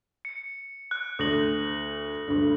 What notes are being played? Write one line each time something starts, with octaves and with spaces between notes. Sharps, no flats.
C#7
F#6
D2 D#6 A#6 F#7
D2 G2